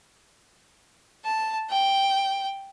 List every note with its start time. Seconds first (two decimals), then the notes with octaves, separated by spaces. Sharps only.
1.23 A5
1.71 G5